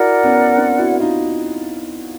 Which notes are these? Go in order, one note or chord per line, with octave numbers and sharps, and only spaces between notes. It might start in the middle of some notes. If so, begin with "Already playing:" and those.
Already playing: E4 F#4 A#4 D5 F#5
B3 C#4
C4 D4
E4 F#4
D#4 F4